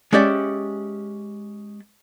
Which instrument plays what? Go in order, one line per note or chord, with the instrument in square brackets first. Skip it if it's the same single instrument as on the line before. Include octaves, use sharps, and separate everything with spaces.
[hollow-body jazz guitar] G#3 C#4 G4 D5 E5